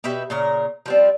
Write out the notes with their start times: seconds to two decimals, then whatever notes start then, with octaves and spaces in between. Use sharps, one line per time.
0.04 B2 G4 B4 E5
0.30 A#2 C#3 A#4
0.86 F3 G3 C4